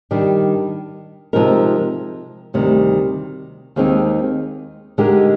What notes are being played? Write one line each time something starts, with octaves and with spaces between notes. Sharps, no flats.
D#3 G3 D4
C3 F3 G#3 D#4 A#4
D2 C3 D#3 G3
D#2 D#3 G#3 C4 D#4
D3 G#3 D#4 G4 A#4